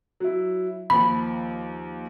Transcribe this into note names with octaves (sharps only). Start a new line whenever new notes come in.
F#3 E4
D#2 F3 B5